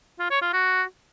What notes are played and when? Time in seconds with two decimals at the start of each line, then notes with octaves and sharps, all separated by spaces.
0.19 F4
0.30 C#5
0.42 F4
0.53 F#4